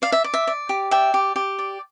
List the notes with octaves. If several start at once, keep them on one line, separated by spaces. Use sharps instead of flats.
D5 F5
E5
D5
E5
D5
G4
D5 E5 G5
G4
G4
D5